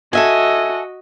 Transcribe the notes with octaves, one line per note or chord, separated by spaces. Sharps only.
F#4 A4 D#5 E5 G#5